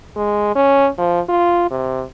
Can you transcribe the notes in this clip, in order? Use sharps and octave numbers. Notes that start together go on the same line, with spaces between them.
G#3
C#4
F3
F4
C3